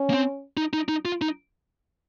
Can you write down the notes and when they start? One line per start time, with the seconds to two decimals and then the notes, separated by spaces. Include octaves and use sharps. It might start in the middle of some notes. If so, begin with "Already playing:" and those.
Already playing: C#4
0.10 A#3
0.14 C4
0.57 D#4
0.73 D#4
0.88 D#4
1.05 F4
1.22 D#4